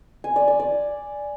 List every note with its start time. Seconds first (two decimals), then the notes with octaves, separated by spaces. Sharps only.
0.24 G#5
0.36 D5
0.48 D5
0.60 D5